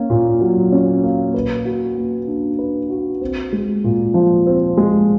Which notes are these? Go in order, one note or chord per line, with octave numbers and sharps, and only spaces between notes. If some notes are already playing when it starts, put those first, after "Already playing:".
Already playing: A#3 C#4
A#2
F#3
C#4
A#3
B4
F#4
A#3
D4
B4
F#4
C4
G#3
A#2
F3
C4
G#3